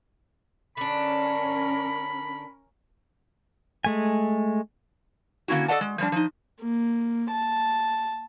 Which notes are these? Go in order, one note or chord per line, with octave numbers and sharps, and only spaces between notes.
D3 C#4 D4 A#4 B5
G#3 A3 G#5
D3 A#3 C#4 E4 F#4
A4 D5 D#5 F#5 A5
G#3
F3 G3 D4
F3 D#4
A#3
A5